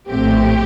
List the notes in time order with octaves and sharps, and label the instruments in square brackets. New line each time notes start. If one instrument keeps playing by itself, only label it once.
[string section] A#1 A2 A3 C4 G4